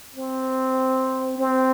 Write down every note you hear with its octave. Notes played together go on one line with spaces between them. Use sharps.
C4
C4